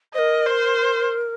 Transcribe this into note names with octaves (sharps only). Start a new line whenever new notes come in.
A#4 C5 D#5
C5